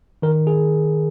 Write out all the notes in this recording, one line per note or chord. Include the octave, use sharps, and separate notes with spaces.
D#3 A#4
G#4